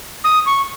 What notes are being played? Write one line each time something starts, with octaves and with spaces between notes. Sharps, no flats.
D#6
C#6